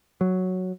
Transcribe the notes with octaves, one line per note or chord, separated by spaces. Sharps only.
F#3